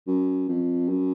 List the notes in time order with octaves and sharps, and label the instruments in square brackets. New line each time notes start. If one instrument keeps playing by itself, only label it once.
[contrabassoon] F#2
F2
F#2